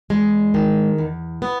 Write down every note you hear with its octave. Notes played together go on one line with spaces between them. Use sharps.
E2 G#3
D#3
E2
B3